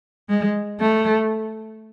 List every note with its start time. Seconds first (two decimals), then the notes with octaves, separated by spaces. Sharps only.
0.29 G#3
0.80 A3